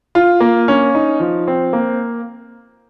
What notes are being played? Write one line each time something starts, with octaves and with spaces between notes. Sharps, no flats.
F4
A#3
C#4
D#4
F3
C4
A#3